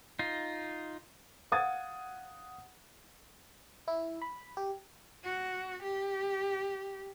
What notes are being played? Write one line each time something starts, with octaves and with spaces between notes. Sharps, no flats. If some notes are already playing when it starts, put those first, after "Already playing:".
D#4 F4
F5 F#5 D#6 G#6 A6
E4
B5
G4
F#4
G4